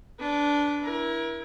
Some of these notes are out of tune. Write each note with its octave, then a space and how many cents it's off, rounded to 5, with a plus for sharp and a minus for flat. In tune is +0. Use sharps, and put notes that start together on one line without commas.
D4 -15 B4 +5
E4 +0 A#4 +35